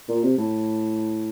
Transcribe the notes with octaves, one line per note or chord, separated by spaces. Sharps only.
A#2
C3
A2